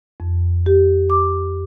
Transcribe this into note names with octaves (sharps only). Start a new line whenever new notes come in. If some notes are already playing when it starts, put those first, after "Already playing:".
F2
G4
D6